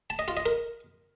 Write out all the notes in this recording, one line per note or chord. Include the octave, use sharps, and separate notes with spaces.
A5
D#5
F4
D#5
A#4